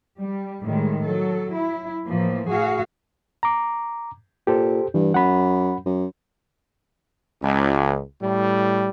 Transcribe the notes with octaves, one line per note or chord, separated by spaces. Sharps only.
G3
A2 D#3 G3 G#3
F#3 A4
E4
A2 E3 F3 A#3
A2 F#4 G#4 F5
A#5 D6
A#2 G4 A4 C5
G2 E3
F#2 F#5 B5
F#2
C#2
A2 G3